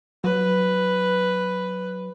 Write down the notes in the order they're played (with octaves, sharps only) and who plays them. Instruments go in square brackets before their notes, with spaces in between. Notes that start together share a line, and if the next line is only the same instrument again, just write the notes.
[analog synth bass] F#3 [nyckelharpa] B4